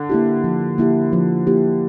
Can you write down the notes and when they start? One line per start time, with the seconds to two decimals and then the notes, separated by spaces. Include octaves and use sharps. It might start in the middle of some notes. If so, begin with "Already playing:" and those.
Already playing: D3
0.09 A#3 E4 G4
0.44 F3
0.78 A#3 E4 G4
1.13 F3
1.47 A#3 E4 G4